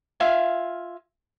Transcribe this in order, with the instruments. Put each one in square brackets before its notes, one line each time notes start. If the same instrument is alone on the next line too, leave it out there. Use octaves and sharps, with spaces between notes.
[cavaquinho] F4 E5 F5 G#5